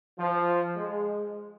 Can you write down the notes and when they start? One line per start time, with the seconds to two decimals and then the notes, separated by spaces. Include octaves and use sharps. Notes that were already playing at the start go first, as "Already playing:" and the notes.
0.19 F3
0.76 G#3